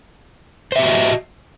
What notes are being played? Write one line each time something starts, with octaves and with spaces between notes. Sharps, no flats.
F#4 G4 C5 D#5 E5